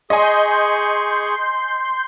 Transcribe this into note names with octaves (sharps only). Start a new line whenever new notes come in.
G#4 D#5 G#5 C6 C#6 G6